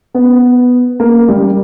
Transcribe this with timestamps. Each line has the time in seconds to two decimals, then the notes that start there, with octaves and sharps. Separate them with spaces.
0.14 B3
1.00 A#3
1.28 G3